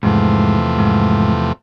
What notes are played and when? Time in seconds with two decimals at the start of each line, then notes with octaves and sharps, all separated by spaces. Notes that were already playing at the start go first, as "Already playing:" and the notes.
0.03 E2 G#2 C3 F3 A3
0.78 G#2